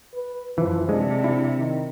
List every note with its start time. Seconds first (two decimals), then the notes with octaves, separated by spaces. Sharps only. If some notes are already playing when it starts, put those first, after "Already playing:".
0.14 B4
0.58 F#2 E3 F3
0.89 C3 G#3 D4
1.24 E4
1.57 D#3